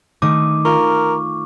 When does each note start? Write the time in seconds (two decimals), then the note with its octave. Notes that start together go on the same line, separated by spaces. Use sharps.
0.22 D#3 A3 D6 D#6
0.65 F4 A#4 C#6